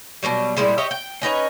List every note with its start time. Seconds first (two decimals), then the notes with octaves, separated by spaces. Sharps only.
0.23 B2 E3 F#3 G3
0.57 A#2 G3 G#3 E4
0.78 G4 C#5 D#5 E5
0.91 G5
1.22 C#4 D#4 B4 C#5